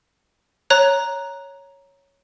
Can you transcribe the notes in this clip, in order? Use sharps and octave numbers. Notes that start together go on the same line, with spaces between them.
C#5 A#5 F#6